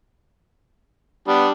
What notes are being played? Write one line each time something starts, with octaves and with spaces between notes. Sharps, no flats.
G3 B3 D4